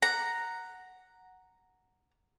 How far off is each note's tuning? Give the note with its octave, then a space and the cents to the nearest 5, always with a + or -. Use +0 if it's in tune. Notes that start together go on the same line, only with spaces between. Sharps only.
F#5 +0 A#5 +0